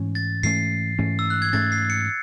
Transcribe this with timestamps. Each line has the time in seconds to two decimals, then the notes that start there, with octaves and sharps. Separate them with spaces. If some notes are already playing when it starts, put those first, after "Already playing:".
Already playing: G#2 E3 A3 C#4
0.15 A6
0.43 G#2 E3 A3 C#4 C7
0.98 G#2 E3 A3 C#4
1.19 E6
1.30 F#6
1.42 G#6
1.53 G#2 E3 A3 C#4 A6
1.72 C7
1.90 C#7